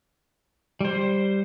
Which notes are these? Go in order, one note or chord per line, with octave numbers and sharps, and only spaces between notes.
G3 C5